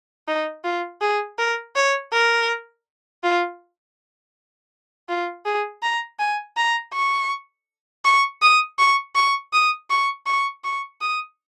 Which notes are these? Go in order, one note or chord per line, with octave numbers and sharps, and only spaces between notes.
D#4
F4
G#4
A#4
C#5
A#4
F4
F4
G#4
A#5
G#5
A#5
C#6
C#6
D#6
C#6
C#6
D#6
C#6
C#6
C#6
D#6